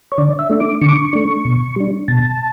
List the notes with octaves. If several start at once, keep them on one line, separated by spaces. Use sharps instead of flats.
C#5
D3 D5
E5
A3 D4
D6
D3 C#6
D6
C#6
A3 D4
B2
G3 D4
B2 A5